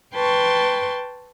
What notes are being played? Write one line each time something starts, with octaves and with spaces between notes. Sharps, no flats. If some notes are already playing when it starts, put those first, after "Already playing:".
B4 G5 A5 C6 C#6